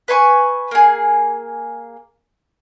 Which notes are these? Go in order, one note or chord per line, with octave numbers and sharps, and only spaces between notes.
B4 G#5 C6 C#6
A#3 G#4